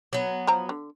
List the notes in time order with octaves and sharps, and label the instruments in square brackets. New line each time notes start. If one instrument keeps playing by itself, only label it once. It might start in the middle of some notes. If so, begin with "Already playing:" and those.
[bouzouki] F#3 B3
[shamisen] F3 C5 A#5
D3